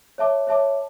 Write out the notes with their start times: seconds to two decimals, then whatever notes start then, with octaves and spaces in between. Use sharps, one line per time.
0.18 C#5 E5 A5 D6
0.47 C#5 E5 A5 D6